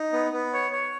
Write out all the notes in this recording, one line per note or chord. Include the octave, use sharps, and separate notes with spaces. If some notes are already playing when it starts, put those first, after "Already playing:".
Already playing: D#4
B3
B3
C#5
C#5